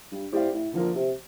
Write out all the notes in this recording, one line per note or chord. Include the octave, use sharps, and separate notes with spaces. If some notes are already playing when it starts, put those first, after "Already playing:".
G2
A2 C4 G4 D5 F5
A2
A#2 D3 F3 A#3 F4 A#4
C3